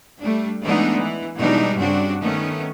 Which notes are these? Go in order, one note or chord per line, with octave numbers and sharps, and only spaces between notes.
G3 A3 D4
E3 G#3 A3 B3 D4 D#4
E3
B2 E3 G3 G#3 D4 D#4
G2 C#3 C4 D4 F#4
D#3 A3 B3 C#4